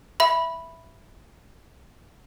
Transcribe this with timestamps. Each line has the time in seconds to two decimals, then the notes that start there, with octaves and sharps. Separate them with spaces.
0.20 E5 B5